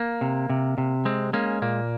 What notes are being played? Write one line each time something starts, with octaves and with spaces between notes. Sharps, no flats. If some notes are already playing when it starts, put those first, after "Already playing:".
Already playing: A#3
C3
C3
C3
G#3 C4
G#3 A#3 C#4
A#2 A#3